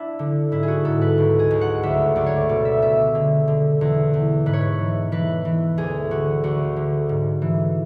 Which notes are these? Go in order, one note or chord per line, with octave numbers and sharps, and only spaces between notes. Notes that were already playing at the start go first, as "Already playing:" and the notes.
Already playing: D4 E4
D3
G#2 E4
G#4
F#4
G#2 A4
B4
C#2
G#4
C#2
F#5
D2 E5
D2 D5
C#5
D5
B2 D5
E5
C#2 E5
D3
D3
E2
E2
G#2 B4
C#5
B4
E3
E3 B4
E3
D2 G#4
D3 F#4
D2 F#4
D3
G#2
E3